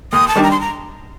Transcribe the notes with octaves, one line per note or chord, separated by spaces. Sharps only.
D#2 D#6
A5
D#3 G3 D4
A#5
C6
A#5